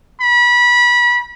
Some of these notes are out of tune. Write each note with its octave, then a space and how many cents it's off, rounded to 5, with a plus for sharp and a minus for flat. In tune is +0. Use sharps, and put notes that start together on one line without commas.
B5 -25